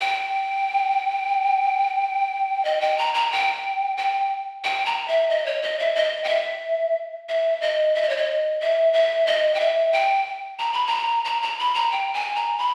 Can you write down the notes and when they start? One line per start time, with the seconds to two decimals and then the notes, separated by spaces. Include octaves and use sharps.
0.01 G5
2.65 D#5
2.81 G5
2.98 A#5
3.14 A#5
3.32 G5
3.97 G5
4.64 G5
4.86 A#5
5.08 E5
5.30 D#5
5.46 C#5
5.63 D#5
5.79 E5
5.95 D#5
6.24 G5
6.29 E5
7.29 E5
7.61 D#5
7.95 E5
8.02 D#5
8.09 C#5
8.17 D#5
8.61 E5
8.93 E5
9.27 D#5
9.54 G5
9.60 E5
9.93 G5
10.59 A#5
10.73 B5
10.87 A#5
11.25 A#5
11.42 A#5
11.59 B5
11.74 A#5
11.91 G5
12.13 G#5
12.36 A#5
12.58 B5